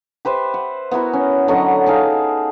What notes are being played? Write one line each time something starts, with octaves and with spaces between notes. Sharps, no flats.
G4 B4 C5 E5
F#5
B3 E4 F#4 A#4
C#4
D3 F#3 D#5 C#6
D#4 G#4 A4 F5